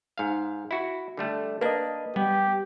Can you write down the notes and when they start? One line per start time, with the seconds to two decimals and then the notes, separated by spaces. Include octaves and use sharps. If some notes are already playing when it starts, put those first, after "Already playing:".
0.18 G#2 F5
0.71 E4 F#4
1.17 D3 G3 A3
1.61 A#3 D4 B4 D#5
2.16 G3 B3 G4